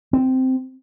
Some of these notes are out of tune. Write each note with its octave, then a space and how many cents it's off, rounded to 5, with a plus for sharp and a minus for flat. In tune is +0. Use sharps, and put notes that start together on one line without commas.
C4 -10